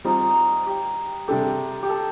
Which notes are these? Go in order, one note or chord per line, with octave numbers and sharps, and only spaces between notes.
G3 C4 D#4 F4
G4
C3 G3 D4 G4 A4
G4
A4